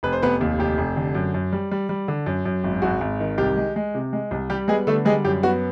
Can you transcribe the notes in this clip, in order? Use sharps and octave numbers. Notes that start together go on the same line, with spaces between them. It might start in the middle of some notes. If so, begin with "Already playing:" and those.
F1 B4
C5
F1 B3 B4
D#2
F1 G4
F1
D3
F#2
F#2
G3
G3
G3
D3
F#2
F#2
G#1
G#1 F#4
G#1
D#3
C2 G4
G#3
G#3
C3
G#3
C2
G3 G4
G#3 B3 G#4
D3 A3 A4
G3 G#3 G#4
F#2 G4
B3 F#4